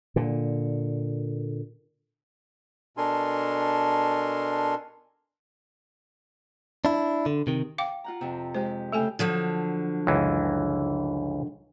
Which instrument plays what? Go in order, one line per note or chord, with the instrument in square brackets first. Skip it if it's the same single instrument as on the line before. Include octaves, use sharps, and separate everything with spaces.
[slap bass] A#2 D3
[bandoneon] B2 D4 A4 A#4 G#5 C6
[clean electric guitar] D4 E4
D3
C3 D#3
[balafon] F5 G5 D6
[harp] F4 F#5 A#5
F2 C3
[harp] G#3 G4 [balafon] C5
[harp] C#3 G5 E6 [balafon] A3 A4 G#5
[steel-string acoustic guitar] D3 F3 F#3
[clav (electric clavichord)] C#2 F#2 E3